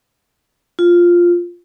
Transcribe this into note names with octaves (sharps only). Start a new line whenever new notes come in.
F4